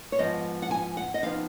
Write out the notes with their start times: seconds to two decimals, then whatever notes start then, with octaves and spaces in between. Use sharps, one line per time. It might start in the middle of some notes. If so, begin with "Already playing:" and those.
0.12 C#5
0.19 G#2 F3 B3 D#5
0.62 F#5
0.71 G#5
0.97 F#5
1.14 D#5
1.23 F2 F3 B3 D#4 F5